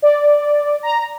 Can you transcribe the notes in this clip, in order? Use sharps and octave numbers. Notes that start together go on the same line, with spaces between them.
D5
A#5